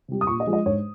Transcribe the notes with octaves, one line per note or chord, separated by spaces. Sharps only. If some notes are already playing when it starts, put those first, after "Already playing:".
C3 G3
D#6
A#2 C#6
D#5
F3 G#3
D#5
G#2 C#5